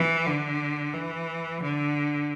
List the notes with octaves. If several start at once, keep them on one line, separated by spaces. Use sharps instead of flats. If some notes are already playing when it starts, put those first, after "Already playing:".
Already playing: E3
D3
E3
D3